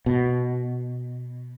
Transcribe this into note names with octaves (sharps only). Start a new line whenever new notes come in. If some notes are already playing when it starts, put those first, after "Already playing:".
B2